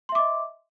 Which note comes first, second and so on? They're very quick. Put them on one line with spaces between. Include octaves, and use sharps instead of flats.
C6 E5 D6 D#5